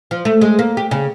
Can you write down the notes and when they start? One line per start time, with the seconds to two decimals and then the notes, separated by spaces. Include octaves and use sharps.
0.11 F3
0.25 A3
0.41 G#3
0.59 A#3
0.77 G4
0.91 C#3